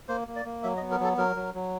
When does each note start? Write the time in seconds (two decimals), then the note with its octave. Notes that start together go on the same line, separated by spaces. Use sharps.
0.08 A#3 C5
0.28 A#3
0.36 D5
0.45 A#3
0.63 F#3 E5
0.77 D#5
0.81 B3
0.91 A#4
1.00 F#3 A4
1.17 F#3 A#4
1.36 F#3
1.54 F#3